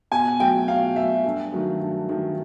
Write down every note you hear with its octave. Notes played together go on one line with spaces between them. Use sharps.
B2 G#5
F#3 A3 G5
B2 F5
F#3 A3 E5
G2
D#3 F#3 A3
G2
D#3 F#3 A3